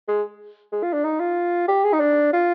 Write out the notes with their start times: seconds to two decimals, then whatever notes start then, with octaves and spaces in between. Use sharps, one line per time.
0.08 G#3
0.72 G#3
0.83 F4
0.93 D4
1.04 D#4
1.20 F4
1.68 G4
1.84 G#4
1.93 D#4
2.00 D4
2.33 F4